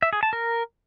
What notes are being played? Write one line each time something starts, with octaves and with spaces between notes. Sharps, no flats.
E5
G#4
A5
A#4